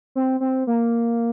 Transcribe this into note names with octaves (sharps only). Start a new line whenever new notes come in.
C4
C4
A#3